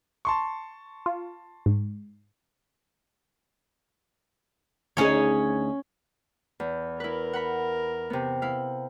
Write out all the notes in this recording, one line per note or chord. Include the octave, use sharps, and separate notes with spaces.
A5 C6 C#6
F4
G#2
D2 C#4 D#4 G#4 C#5
E2
E4 A#4 B4
F#5 B5
C3 B3
E4 F5